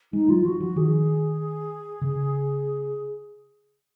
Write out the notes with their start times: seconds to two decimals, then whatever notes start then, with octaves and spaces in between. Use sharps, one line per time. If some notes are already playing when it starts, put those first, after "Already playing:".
0.12 G#3 D#4
0.29 F#3 F4
0.45 F3 F#4
0.60 F3 F#4
0.76 D#3 G#4
2.01 C#3